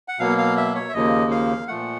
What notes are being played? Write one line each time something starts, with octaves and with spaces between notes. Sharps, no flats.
F#5
B2 F#3 A#3 F5
F5
E5
C#5
E5
D#2 C#3 F3 A#3 D#5
F5
A#2 F3 A3 F#5